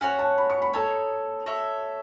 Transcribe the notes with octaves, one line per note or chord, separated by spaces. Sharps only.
C#4 F#4 C#5 F#5 G#5
A5
B5
C#6
B5
D#4 A4 C#5 A5
F#4 A4 C#5 E5